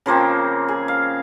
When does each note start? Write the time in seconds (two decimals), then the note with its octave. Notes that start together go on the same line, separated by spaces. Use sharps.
0.06 C#3 F3 A#3 C4
0.68 G#4
0.88 F5